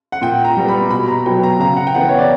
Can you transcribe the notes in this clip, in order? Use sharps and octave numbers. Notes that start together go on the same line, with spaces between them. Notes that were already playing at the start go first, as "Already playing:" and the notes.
F#5
A#2 G5
A#5
G3 B3
B5
B2 B5
A#5
F#3 B3 G5
A#5
C#3 A#5
F#5
G5
E3 B3 F#5
C#5
D5